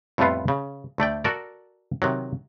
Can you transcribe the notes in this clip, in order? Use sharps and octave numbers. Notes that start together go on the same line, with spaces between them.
F2 A2 G3 A3 B3 F4
C#3
D2 A3 D5 G5
F#4 A4 A#4 D5
C3 D#3 F#3